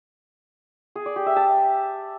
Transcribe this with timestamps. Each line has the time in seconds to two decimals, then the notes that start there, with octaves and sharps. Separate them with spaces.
0.95 G#4
1.06 D5
1.16 G4
1.26 E5
1.36 A5